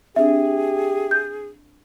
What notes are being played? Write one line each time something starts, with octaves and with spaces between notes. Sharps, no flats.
C4 D4 G4 G#4 E5
G6